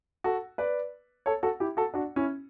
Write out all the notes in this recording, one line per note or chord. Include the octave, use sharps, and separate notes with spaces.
F#4 A4
B4 D5
A4 C#5
F#4 A4
E4 G4
F#4 A4
D4 F#4
C#4 E4